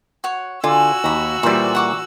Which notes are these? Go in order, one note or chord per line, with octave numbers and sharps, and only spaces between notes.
F#4 C#5
D3 F4 F#4 G#5 E6
D#2 A#5 B5
A#2 E3 G3 C5 D5
F#5 C#6 D6